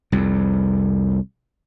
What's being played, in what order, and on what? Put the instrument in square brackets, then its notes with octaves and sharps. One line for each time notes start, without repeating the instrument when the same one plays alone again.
[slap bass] C2 F2